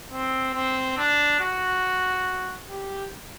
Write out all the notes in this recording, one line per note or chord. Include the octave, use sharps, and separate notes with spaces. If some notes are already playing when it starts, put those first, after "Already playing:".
C4
C4
D4
F#4
G4